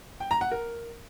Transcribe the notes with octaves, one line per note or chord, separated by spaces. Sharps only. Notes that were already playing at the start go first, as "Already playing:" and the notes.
G5
A#5
F#5
A#4